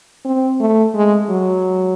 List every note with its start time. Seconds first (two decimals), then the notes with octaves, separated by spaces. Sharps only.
0.25 C4
0.60 A3
0.95 G#3
1.29 F#3